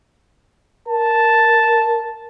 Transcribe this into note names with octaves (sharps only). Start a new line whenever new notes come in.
A#4 A5